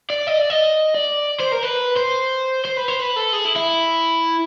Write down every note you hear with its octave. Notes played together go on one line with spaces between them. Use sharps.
D5
D#5
D5
D#5
D5
C5
A#4
B4
C5
C5
B4
C5
B4
A4
G#4
E4
E4